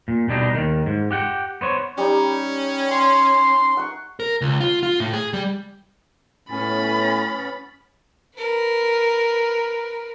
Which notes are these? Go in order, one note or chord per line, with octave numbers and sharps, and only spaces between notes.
A#2
B2 G3 D4 D#4
D#2 D#3
G#2
G4 F#5 G5
B3 C5 C#5
G3 C#4 D#4
G#5 C6
F#5 C#6
A#4
C#2
F4
F4
A2
G#4
G3
A2 B3 C#4 G#5 B5 A6
A#4 B4